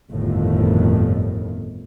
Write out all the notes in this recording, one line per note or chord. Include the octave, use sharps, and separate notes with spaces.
G1 F2 A2 D#3